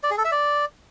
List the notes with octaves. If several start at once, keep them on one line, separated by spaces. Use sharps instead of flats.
D5
G#4
A4
E5
D5